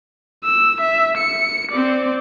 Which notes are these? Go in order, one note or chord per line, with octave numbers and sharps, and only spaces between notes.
E6
E5
C#7
C4 D5